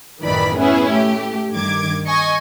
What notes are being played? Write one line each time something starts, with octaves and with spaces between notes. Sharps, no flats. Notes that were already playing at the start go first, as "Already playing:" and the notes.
A1 F#2 D#3 E3 D5 B5
B3 C#4 E4 G#4
A3 G4
G2 D#3 D6 G#6
D#5 G#5 C#6